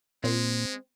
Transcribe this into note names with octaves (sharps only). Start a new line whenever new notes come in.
A#2 G#3 C4